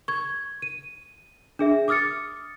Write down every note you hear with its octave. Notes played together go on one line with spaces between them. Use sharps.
C#6 G#6
D#7
D4 G#4 E5
D6 D#6 F6 A6 C#7